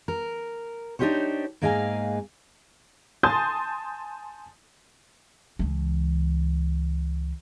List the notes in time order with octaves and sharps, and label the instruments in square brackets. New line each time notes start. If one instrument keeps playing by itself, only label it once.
[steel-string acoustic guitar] A#4
D4 D#4 F#4 G4 C5 C#5
G#2 A#3 G#4 D#5 F5 G#5
[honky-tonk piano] G#5 A5 C6 D#6 G6 A6
[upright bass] C#2 E3